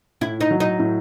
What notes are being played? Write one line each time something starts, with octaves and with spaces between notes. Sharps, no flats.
A2 E4
D#4
F#3
D#4
A2